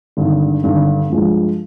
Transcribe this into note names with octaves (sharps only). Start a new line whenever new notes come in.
G#1 G2 D3
G#1 G2 D3
G2 F3 G#3